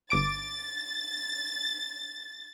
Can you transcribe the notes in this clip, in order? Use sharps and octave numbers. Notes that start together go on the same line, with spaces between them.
G1 D6 A6 D7